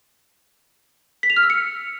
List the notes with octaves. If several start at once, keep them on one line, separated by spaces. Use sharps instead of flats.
B6
F7
F6
E6
C#7